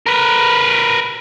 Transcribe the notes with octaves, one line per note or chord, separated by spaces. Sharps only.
A#4 B4